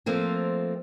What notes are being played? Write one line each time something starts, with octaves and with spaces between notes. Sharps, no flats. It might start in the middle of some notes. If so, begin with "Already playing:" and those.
F3 A3 A#3 C4